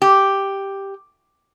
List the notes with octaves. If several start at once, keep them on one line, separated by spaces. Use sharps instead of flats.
G4